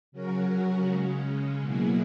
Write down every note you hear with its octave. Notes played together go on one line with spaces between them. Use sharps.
C#3 F#3 C#4 F#4 A#4
C#3 G#3 C#4
B2 F#3 A#3 E4 G#4